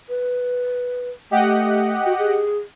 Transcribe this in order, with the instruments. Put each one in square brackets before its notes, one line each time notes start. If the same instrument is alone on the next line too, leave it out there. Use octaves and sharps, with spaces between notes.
[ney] B4
[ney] A3 [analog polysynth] G4 D#5 F#5
[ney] F#4
G#4